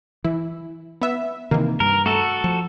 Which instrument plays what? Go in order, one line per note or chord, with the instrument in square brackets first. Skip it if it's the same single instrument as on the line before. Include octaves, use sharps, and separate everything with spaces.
[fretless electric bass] E3 [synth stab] E4
[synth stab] B3 E5
[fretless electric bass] C3 E3 [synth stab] D#3 A#3
[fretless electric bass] G2 [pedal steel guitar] A#4
[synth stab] A3 [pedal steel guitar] F#4 A4
[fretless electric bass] F3